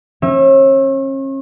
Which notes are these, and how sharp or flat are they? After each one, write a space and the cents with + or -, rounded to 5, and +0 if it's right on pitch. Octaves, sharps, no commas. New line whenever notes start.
C#4 -40 E5 +0